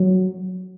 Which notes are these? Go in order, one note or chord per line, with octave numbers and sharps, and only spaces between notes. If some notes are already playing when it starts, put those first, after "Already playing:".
Already playing: F#3